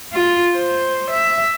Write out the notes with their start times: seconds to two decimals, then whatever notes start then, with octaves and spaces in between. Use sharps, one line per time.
0.13 F4
0.56 C5
1.10 E5